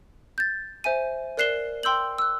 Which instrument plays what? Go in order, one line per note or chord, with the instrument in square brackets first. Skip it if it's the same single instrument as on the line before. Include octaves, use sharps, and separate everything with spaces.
[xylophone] G6 A6
C5 E5 G#5 D#7
A#4 D5 F#6 C7 E7 G7
G5 C6 E6 G6 F#7
E6 F#6